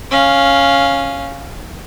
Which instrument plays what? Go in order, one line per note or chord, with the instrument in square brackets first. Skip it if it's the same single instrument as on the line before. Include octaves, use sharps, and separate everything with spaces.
[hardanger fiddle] C#4 F5